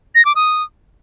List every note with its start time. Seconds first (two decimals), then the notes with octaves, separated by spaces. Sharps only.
0.15 A#6
0.25 D6
0.36 D#6